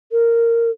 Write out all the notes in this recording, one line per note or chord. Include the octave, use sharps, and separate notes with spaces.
A#4